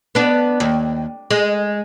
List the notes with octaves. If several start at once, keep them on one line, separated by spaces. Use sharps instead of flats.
B3 D4
D#2
G#3